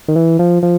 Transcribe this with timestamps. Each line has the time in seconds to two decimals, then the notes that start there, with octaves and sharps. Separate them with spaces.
0.08 D#3
0.16 E3
0.39 F3
0.63 F3